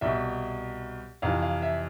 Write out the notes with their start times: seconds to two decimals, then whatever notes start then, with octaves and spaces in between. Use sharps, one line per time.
0.01 C2 B2 E5
1.22 F2 C3 E3 F5
1.42 F5
1.62 E5